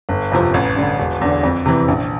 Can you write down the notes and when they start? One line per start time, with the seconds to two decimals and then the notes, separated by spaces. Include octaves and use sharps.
0.09 G1
0.32 F2 C3 F3
0.54 A1
0.76 G2 D3
0.98 E1
1.21 E2 D3
1.43 F2
1.66 C3 E3
1.88 A#1